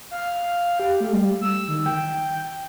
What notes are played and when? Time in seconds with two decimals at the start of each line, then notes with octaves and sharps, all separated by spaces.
0.11 F5
0.80 G4
1.00 A3
1.13 G3
1.42 E6
1.68 D#3
1.86 G5